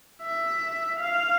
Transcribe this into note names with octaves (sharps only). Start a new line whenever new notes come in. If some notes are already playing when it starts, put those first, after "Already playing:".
E5
F5